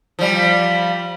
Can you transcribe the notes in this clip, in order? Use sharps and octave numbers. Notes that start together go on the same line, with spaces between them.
F3 G3